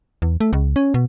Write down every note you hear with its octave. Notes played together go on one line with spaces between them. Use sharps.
E2
A3
C#2
C#4
B2